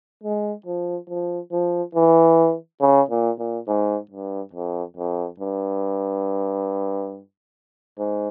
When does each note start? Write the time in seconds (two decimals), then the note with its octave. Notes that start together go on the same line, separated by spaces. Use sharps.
0.23 G#3
0.66 F3
1.09 F3
1.52 F3
1.95 E3
2.81 C#3
3.10 A#2
3.39 A#2
3.68 G#2
4.11 G2
4.53 F2
4.97 F2
5.40 G2
7.99 G#2